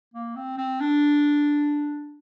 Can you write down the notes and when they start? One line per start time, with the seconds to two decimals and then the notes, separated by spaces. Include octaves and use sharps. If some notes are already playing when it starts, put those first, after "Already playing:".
0.14 A#3
0.36 C4
0.58 C4
0.80 D4